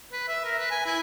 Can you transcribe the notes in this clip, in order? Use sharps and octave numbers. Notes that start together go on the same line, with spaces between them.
B4
E5
A#4
B4
G#5
E4